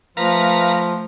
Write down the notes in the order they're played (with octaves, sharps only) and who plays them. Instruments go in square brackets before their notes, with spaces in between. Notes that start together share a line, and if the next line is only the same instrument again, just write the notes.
[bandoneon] F3 [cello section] A3 [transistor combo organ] B4 F5 A#5